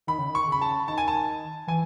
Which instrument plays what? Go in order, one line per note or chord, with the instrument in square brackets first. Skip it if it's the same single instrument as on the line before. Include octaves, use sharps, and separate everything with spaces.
[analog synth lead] D#3 [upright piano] B5
[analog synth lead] C#3
D#3
[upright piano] C#6
[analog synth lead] C#3 [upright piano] B5
[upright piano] A5
[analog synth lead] D#3 [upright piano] A5
[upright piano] G#5
A5
[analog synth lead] E3 [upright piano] G#5